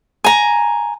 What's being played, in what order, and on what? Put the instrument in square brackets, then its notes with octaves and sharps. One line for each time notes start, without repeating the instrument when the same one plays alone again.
[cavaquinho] G#5 A#5